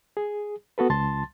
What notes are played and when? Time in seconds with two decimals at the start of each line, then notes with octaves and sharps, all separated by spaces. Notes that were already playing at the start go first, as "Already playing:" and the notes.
0.17 G#4
0.78 B3 F#4 A4 B4
0.90 C#2 A5 C6 A6